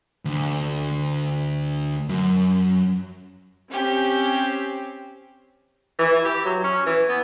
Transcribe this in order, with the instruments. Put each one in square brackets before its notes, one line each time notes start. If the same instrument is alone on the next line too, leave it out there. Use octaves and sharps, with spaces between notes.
[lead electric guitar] D2
F#2
[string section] C4 C#4 G4
[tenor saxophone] E3
E4
G4
F#3
C#4
E3
B3